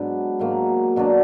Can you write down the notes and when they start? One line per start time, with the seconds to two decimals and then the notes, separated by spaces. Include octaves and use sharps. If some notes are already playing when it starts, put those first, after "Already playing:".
Already playing: G#2 F#3 B3 D4
0.39 G#2 F#3 A#3
0.96 B2 F#3 D4